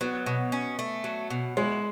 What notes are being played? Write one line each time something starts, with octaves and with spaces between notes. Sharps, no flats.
F#3 B3
B2
C#4
A3
F#3
B2
G#3 E4